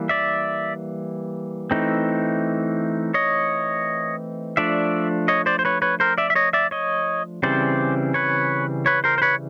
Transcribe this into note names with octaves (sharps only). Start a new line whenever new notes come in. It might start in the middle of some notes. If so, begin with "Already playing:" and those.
Already playing: E3 G3 A#3
D5 E5
E3 A3 C4 D#4
C#5 D#5
F3 A3 D4 D5 E5
C#5 D#5
C5 D5
C5
B4 C#5
B4 C#5
A#4 C5
D5 E5
E5
C#5 D#5
D5 E5
C#5 D#5
C#3 E3 G3 C4 C5 D5
B4 C#5
B4 C#5
A#4 C5
C5
B4 C#5